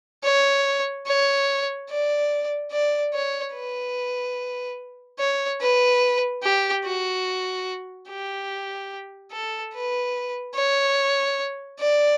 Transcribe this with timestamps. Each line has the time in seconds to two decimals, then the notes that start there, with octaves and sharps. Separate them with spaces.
0.24 C#5
1.06 C#5
1.89 D5
2.72 D5
3.14 C#5
3.54 B4
5.19 C#5
5.61 B4
6.43 G4
6.84 F#4
8.09 G4
9.32 A4
9.74 B4
10.55 C#5
11.80 D5